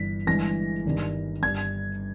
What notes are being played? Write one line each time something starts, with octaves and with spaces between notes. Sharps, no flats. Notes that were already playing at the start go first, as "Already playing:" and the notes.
Already playing: G1 G2 E3 B6
G1 G2 E3 G#3 A#6
G1 G2 D#3 G3
G1 G2 G3 G#6